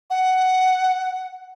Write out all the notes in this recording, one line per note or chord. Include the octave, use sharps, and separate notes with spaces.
F#5